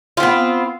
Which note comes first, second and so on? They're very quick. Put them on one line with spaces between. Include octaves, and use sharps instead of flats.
F4 C4 B3